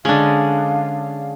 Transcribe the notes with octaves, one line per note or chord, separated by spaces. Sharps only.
D3 G#3 C#4 D4 F5